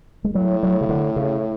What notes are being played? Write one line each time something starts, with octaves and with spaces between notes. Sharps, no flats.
G#3
A2 F#3
F#3
C#3
D3
C#3